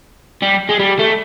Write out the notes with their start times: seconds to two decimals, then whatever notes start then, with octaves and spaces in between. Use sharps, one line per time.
0.42 G3
0.69 G#3
0.80 G3
0.99 A3